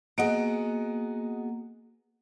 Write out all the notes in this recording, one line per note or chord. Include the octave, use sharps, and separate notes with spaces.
A#3 B3 F#4 G#4 D#5 F#5 D7